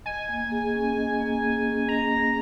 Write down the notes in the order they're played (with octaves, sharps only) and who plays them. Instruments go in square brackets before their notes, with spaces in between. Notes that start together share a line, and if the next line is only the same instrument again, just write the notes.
[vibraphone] D#5 [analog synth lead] G#5
[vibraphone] A#3
G#4
C#4
D#5
A#3
G#4
C#4
[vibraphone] D#5 [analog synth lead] A#5
[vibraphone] A#3